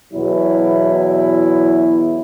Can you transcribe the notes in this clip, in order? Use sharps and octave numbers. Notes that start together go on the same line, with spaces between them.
E2 B2 F#3 E4